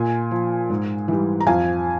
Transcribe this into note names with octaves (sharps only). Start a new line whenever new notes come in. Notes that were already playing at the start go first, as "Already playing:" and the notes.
Already playing: A#2 G#5
F3
G#2
E3 G3
A#5
F2 F5 G#5